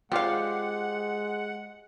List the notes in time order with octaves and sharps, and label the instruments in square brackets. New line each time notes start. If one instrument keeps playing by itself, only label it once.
[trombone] G#3 [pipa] C4 F5 [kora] F4 G4 C5 [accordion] F#5